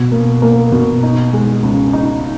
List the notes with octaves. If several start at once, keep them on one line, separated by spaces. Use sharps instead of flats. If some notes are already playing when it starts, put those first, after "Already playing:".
Already playing: B2
A#3
A#3
B2
D#4
G#3
C#2
D#4